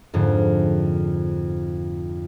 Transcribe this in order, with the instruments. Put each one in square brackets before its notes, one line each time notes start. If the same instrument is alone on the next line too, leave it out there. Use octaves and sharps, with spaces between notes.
[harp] F2 G#2 D3